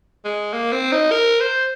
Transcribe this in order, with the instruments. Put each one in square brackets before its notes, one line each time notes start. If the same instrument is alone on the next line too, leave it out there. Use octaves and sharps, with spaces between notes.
[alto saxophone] G#3
A#3
C4
D#4
A#4
C5